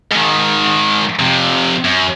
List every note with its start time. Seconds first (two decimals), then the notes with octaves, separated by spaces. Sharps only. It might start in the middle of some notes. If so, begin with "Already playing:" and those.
0.12 G#2 D#3
1.19 F2 C3
1.85 F#2